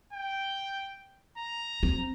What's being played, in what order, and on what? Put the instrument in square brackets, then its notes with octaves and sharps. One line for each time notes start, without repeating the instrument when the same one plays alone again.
[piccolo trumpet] G5
A#5
[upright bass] C4